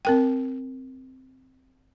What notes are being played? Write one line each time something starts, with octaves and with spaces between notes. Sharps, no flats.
C4 A#4 G5